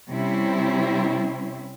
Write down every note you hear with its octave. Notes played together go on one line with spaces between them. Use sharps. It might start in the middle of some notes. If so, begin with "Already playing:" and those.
C3 G3 C4 C#4 E4